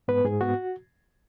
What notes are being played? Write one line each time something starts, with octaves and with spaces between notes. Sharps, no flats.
G#2 B3 B4
G#2 G#4
B3 F#4